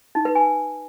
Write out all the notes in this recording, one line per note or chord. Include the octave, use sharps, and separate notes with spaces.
D#4
B4
G#5